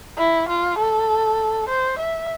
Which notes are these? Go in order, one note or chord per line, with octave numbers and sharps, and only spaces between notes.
E4
F4
A4
C5
E5